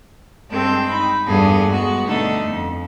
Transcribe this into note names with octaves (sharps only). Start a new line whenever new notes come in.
G2 G#3 C4 G5 A5
D#4 B5
E2 G2 B3 G#4 A4
G#3 B3 F#4
B2 D3 A3 B3 D#4 A4
F2